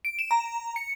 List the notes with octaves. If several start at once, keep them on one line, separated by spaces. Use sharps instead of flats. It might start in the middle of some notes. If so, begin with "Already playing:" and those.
D7
E7
A#5
C#7